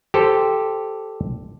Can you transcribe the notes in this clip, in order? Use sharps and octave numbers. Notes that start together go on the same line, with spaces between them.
G4 A4 C5